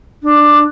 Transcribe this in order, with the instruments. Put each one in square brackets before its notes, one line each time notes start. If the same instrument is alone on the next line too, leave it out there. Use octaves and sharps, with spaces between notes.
[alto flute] D4